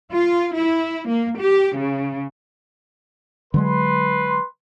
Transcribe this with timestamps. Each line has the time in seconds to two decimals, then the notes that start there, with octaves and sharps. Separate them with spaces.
0.12 F4
0.56 E4
1.08 A#3
1.39 G4
1.78 C#3
3.54 D3 F#3 G#3 B4 C6